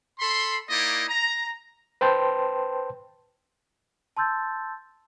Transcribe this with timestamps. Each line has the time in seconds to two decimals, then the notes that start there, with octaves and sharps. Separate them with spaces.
0.20 A4 B5 C6
0.70 A#3 D#4 E4 D5 D#5
1.08 A#5
2.01 B4 C5 G5 A5 C6
4.17 A5 C6 E6 G6 A6